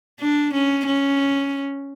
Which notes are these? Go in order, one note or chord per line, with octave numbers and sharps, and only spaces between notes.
D4
C#4
C#4